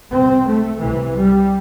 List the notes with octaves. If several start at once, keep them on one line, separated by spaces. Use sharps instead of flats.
C2 C3 C4
A3
C2 C3 E3
G3